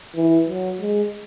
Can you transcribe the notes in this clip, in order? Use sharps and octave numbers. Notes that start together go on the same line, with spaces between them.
E3
F#3
G#3